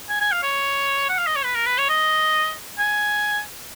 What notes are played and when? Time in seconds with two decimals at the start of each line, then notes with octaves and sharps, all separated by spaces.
0.09 G#5
0.20 G#5
0.31 F5
0.43 C#5
1.09 F#5
1.18 F5
1.27 D#5
1.35 C#5
1.44 B4
1.55 A#4
1.66 B4
1.78 C#5
1.89 D#5
2.79 G#5